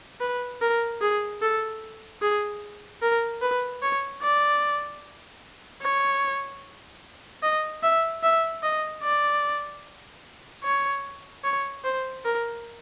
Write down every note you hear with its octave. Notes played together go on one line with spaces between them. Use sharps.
B4
A#4
G#4
A4
G#4
A#4
B4
C#5
D5
C#5
D#5
E5
E5
D#5
D5
C#5
C#5
C5
A#4